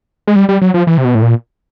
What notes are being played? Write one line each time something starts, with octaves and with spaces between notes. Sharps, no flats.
G#3
G3
G3
F#3
F3
E3
C3
B2
A2
A#2